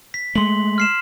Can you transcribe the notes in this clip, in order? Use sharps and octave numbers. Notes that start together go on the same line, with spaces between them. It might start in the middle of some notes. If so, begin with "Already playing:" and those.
B6
G#3 A3 C6 F#7
F6 C7 E7